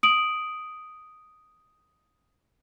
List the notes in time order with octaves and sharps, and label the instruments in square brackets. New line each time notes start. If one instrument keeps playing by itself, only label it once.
[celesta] D#6 D7 F#7